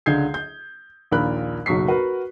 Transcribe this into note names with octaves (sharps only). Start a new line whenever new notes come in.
C#2 D3 G6 G#6 C7
G6
A#1 D#2 A#2 A#4 B5 F#6
F#1 B1 F#3 C#6 B6 C7
F#4 A#4 B4 F#5